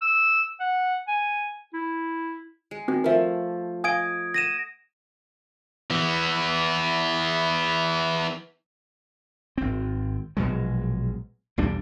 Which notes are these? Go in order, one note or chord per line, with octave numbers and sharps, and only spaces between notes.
E6
F#5
G#5
E4
G#3
D#3 C4 F#4
F3 A3 A#4 E5
D#5 F5 G#5 D#6 G#6 D7
F#5 A#6 D#7 E7
E3 B3
G#1 C4
A#1 B2 F#3 G#3
B1 E2 G3 D4